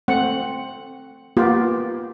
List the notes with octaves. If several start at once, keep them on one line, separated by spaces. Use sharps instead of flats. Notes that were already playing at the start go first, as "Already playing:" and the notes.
A3 C4 F#5
A#3 B3 F4 G4